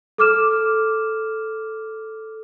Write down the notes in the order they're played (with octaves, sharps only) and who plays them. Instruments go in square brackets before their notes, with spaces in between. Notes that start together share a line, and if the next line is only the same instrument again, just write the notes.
[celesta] A4 D6 F6 E7